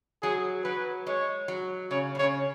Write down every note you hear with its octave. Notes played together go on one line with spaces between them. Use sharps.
F#3 G#4
F#3 B4
G#3 C#5
F#3
C#3 C#5
B2
C#3 C#5